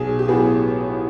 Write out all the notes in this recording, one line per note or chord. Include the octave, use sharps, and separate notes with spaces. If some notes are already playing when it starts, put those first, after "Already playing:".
Already playing: B1 G#4
G4
A2 F#3 B3 G#4